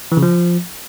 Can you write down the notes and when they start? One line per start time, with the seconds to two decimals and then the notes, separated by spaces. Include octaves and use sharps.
0.12 E3
0.17 C#3
0.22 F3